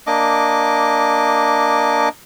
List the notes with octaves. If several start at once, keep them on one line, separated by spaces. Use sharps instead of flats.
A#3 D4 D#5 D6